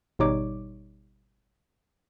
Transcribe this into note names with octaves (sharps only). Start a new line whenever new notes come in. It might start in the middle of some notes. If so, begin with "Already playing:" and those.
G#1 B2 G3 D#4 C#5 D6